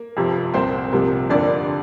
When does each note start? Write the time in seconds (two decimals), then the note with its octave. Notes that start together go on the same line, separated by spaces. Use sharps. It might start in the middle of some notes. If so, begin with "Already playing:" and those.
Already playing: A#3
0.17 F2 C3 F3
0.54 C2 A#2 A#3 C4 C5
0.91 C2 C3 F3 A#3
1.29 F2 D3 A#3 D4 D5